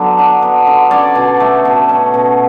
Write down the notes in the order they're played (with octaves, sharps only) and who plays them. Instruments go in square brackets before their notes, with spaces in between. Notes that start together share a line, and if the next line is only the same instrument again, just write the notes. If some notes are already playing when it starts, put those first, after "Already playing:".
Already playing: [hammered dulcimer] D3 F#3 B3
D4
B3
D3
C#4 D5
B2
A3
B2
C#4
B2